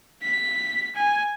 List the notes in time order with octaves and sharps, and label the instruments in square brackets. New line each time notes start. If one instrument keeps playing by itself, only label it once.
[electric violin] B6
G#5